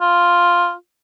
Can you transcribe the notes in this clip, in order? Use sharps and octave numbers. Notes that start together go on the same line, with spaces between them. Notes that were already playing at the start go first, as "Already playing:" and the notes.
F4